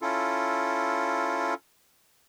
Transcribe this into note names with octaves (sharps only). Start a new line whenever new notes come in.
C#4 E4 F4 A4